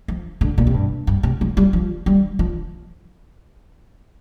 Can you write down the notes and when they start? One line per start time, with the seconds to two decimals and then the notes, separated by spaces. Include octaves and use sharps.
0.08 F3
0.41 D3
0.58 A#2
0.67 C3
0.74 G2
1.07 G2
1.23 C3
1.41 F3
1.57 G3
1.73 F3
2.06 G3
2.39 F3